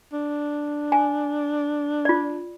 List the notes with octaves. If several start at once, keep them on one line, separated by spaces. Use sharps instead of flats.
D4
G#5
F4 D5